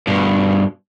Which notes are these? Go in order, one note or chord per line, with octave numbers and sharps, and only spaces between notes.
G2 B2